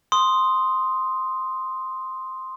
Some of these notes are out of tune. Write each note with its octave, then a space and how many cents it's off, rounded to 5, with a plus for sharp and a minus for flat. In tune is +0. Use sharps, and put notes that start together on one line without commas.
C6 +0 D#6 +0